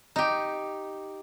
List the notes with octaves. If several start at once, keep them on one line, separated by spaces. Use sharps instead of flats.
D#4 G4